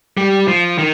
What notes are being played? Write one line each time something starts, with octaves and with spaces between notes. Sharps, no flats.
G3
F3
D#3